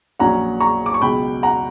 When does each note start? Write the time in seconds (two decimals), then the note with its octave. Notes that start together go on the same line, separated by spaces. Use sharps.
0.19 A#1 A#2 F#3 C#4 F#5 A#5
0.60 A#5 C#6
0.86 D6
0.94 C#6
1.02 C#2 B2 F#3 G5 B5
1.43 F#5 A#5